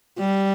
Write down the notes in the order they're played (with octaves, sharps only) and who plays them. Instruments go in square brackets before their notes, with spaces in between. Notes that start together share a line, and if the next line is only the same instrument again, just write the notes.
[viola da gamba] G3